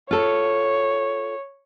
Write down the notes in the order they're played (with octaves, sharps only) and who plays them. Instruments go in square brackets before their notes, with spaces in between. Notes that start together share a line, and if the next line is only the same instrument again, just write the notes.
[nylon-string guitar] F4 A4 [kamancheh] C#5